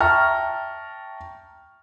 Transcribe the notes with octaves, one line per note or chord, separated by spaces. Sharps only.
E5 G5 A5 A#5 C#6 F6